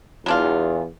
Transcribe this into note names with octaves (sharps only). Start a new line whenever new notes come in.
E2 F#3 D4 F4